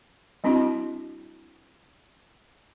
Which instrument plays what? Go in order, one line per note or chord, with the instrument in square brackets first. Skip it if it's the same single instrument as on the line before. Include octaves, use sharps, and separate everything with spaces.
[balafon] G3 C4 D4 E4 F#4